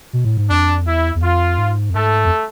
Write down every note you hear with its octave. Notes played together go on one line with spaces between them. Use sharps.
B2
A2
G#2
F2 D4
E2 E4
E2
F2 F4
G#2
F2
G#2 A3 A4
F2